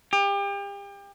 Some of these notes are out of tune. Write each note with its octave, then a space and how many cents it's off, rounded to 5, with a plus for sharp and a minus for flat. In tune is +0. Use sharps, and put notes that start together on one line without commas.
G4 +35